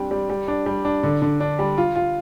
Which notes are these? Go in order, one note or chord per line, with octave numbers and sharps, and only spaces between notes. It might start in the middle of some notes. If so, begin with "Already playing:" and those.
Already playing: G3 C4 D4 G4
G3
G3
D4
G3
D4
D3
D3
D4
G3
F4
F4